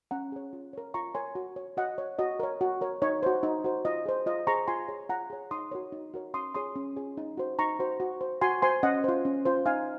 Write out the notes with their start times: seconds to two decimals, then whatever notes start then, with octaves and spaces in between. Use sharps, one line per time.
0.11 C#4 F#5 A#5
0.32 G#4 C#5
0.53 F4
0.73 A#4 C#5
0.94 F4 A#5 C#6
1.14 A#4 C#5 G#5 C6
1.35 F#4
1.56 C#5
1.77 F#4 D#5 F#5
1.98 C#5
2.19 F#4 D#5
2.40 A#4 C#5
2.61 F#4
2.81 A#4 C#5
3.02 D#4 C#5
3.23 F#4 C5
3.43 D#4
3.64 F#4 C5
3.85 F4 D#5
4.06 G#4 C5
4.26 F4 D#5
4.47 G#4 C5 A#5 C#6
4.67 F4 G#5 C6
4.88 G#4 C#5
5.09 F4 F#5 A#5
5.30 G#4 C#5
5.51 D#4 C6 D#6
5.72 F#4 A#4 C#5
5.92 D#4
6.14 F#4 A#4 C#5
6.34 C#4 C6 D#6
6.54 F4 G#4 C#5 C6 D#6
6.75 C#4
6.96 F4 G#4 C#5
7.17 D#4
7.37 F#4 C5
7.59 D#4 A#5 C#6
7.79 F#4 C5
8.00 F#4
8.21 C5
8.41 F#4 G#5 C6
8.62 C5 G#5 C6
8.83 C#4 D#5 F#5
9.04 F4 C5
9.25 C#4
9.45 F4 C5
9.66 D#4 F5 G#5